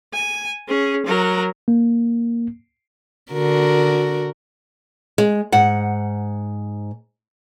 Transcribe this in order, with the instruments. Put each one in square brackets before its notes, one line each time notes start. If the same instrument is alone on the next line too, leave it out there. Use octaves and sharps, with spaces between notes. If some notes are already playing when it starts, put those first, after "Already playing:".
[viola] G#5
C#4 G#4
F#3 A#4
[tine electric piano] A#3
[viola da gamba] D3 F#4 A#4
[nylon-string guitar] G#3
G#2 F#5